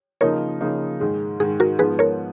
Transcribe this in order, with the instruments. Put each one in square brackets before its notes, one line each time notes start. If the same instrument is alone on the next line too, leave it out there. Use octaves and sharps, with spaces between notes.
[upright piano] C#3 F3 A#3 D#4 [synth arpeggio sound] A#4 C#5
[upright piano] C#3 F3 A#3 D#4
G#2 D#3 G#3
[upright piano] G#2 D#3 G#3 [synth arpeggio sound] G#4
[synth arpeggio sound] F#4 A#4
[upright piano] G#2 F3 B3 [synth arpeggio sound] G#4 B4
[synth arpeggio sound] A#4 C#5